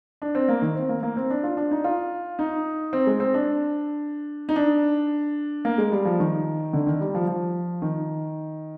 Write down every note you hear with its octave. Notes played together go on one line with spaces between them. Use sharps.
D4
C4
A#3
D#3
C4
A#3
A#3
C4
D4
F4
D4
D#4
F4
D#4
C4
G#3
C4
D4
D#4
D4
A#3
G#3
G3
F3
D#3
D3
D#3
G3
F3
F3
D#3